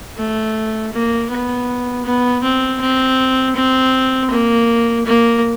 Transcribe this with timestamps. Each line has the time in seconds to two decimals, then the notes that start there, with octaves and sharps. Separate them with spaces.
0.18 A3
0.93 A#3
1.30 B3
2.05 B3
2.43 C4
2.80 C4
3.55 C4
4.30 A#3
5.06 A#3